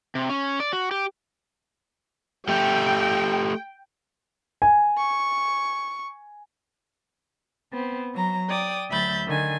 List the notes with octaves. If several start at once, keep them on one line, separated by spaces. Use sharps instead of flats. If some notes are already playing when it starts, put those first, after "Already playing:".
C3
C#4
D5
F#4
G4
A3 G4 G5
G#5
C#6
B3 C4
F#3 A#5
D5 G5 D#6
D2 F#3 E5 B5 G6 A6
D3 D#3 G#5